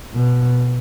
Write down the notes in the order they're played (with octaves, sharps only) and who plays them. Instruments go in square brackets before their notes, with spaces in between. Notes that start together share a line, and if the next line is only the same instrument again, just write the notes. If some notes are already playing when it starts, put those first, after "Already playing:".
[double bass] B2